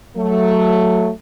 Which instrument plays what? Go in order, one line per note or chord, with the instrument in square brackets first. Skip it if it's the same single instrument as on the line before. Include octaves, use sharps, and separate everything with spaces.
[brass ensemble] F#3 A3